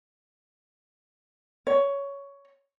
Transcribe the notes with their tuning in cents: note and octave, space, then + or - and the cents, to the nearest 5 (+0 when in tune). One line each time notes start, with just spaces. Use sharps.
C#5 +10